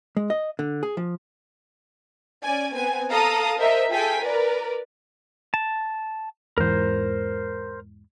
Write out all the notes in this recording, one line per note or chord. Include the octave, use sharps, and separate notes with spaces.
G#3
D#5
D3
G#4
F3
C#4 D5 G#5
B3 C4 G#5
A4 F5 A5 A#5 D#6
A#4 C5 D#5 E5
F4 G#4 A4 G5 G#5 B6
A#4 B4 D5
A5
E2 G#2 E3 A#4 C5